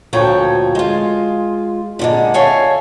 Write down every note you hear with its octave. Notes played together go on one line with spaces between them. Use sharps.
D2 A#2 F3 A4 C#5 G5
G#3 F4
A#2 D3 G#3
A4 C#5 E5 F5 G#5